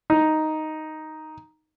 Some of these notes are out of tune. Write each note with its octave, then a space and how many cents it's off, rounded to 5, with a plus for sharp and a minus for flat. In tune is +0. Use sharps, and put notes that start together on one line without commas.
D#4 +0